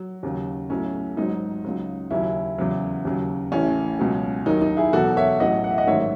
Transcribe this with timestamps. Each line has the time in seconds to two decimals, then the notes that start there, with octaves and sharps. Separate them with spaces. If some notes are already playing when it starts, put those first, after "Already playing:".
Already playing: F#3
0.23 D#2 C#3 F#3
0.70 B1 A2 F#3 C#4
1.17 G#1 G#2 F#3 D#4
1.65 C#2 C#3 F#3
2.11 D#2 C#3 F#3 C#4 E4
2.58 E2 C#3 F#3
3.05 D#2 C#3 F#3
3.52 A1 A2 E3 C#4
3.99 C#2 B2 F#3
4.46 D#2 D#3 F#3 D#4
4.62 D#4
4.77 E4 G#4
4.93 E2 B2 F#3 F#4 A4
5.17 C#5 E5
5.39 A1 A2 F#3 D#5 F#5
5.64 F#5
5.70 E5
5.78 D#5 F#5
5.87 A1 G#2 D#3 F#3 C#5 E5